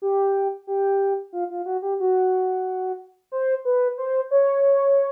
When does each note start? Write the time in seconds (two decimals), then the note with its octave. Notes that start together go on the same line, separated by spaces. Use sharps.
0.02 G4
0.67 G4
1.33 F4
1.50 F4
1.66 F#4
1.82 G4
2.00 F#4
3.32 C5
3.65 B4
3.98 C5
4.31 C#5